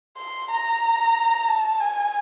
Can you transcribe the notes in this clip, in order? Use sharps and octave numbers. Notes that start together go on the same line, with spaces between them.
C6
A#5
A5
G#5